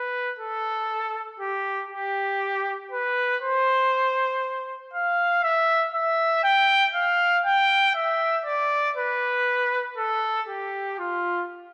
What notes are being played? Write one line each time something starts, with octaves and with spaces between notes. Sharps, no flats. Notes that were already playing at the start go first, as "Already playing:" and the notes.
Already playing: B4
A4
G4
G4
B4
C5
F5
E5
E5
G5
F5
G5
E5
D5
B4
A4
G4
F4